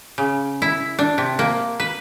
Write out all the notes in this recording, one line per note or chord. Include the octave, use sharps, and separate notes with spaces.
C#3
E4
D4
C3
A#3
B4